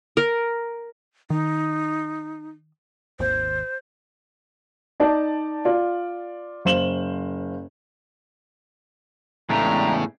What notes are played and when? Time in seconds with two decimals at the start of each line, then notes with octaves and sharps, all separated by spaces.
0.17 A#4
1.30 D#3 D#4
3.20 G#1 D#2 C5
5.00 D#4 D5 A5
5.65 F4 D5
6.65 F#1 C5 F5 E7 F#7 G7
9.50 E2 A2 C#3 G#3 A3 D4 G4 A#5